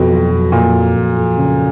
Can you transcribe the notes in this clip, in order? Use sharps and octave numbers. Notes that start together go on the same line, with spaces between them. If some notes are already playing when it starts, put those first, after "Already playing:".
Already playing: F2 B2
F#3
F2
F2 A#2
F#3
F2
F2
C#3